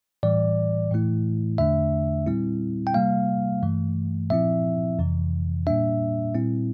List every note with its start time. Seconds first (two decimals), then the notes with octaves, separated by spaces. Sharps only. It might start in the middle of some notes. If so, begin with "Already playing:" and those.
0.23 A2 E3 G3 D5
0.91 A2 E3 A3 E4
1.58 E2 D3 A3 D4 E5
2.26 A#2 G3 C4 E4
2.87 G5
2.94 C3 G3 A#3 F5
3.63 G2 E3 A3
4.30 A#2 F3 C4 E4 E5
4.99 F2 C3 E3
5.67 A#2 G3 A#3 D4 E5
6.34 A#2 G3 C4 E4